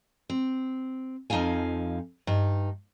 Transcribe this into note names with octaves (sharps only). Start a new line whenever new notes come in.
C4
F2 F3 D#4 F4 F5 G#5
G2 D#4